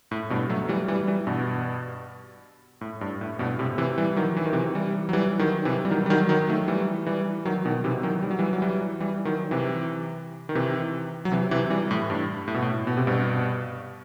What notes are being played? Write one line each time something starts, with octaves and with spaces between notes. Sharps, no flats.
A2
G2 B2
F#3 A3
F#3
E3 G3
E3 G3
E3 G3
G2 B2
A2
G2
A2
G2 B2
A2 C3
C3 E3
E3 G3
D#3 F#3
E3
D#3
C3 E3
E3 G3
F#3
E3 G3
D#3 F#3
C3 E3
G3
D#3 F#3
G3
D#3 F#3
D#3 F#3
F#3 A3
E3 G3
E3 G3
D#3 F#3
B2 D#3
C3 E3
D#3 F#3
G3
F#3
E3 G3
F#3
E3 G3
E3 G3
D#3 F#3
C3 E3
D#3
C3 E3
F#3
C3 E3
C3 E3
E3 G3
A2
G2
A2
B2
A2
B2
C3
G2 B2